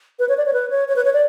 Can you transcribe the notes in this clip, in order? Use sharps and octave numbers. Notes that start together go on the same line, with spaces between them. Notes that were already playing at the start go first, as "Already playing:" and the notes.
B4
C#5
D5
C#5
B4
C#5
C#5
B4
C#5
D5